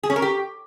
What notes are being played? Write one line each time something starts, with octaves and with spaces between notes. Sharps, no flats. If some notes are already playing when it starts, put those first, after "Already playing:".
G#4
C#4
A#4
G4